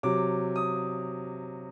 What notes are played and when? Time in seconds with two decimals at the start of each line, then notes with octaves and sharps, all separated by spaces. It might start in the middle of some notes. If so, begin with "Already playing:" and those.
0.03 C3 F#3 D6
0.56 D#6